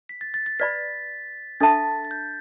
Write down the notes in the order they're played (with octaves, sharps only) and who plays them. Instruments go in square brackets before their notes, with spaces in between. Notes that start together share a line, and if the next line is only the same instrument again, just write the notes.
[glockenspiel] B6
A6
A6
A6
[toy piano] B4 D5 B5 [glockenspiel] B6
[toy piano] D4 A4 E5 A5 [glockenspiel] A6
[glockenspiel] A6
G6